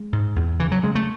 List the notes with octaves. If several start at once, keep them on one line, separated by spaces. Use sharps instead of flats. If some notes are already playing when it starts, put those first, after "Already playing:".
Already playing: G#3
G#2
E2
C#3 E3
F#3
C#3 G#3
A3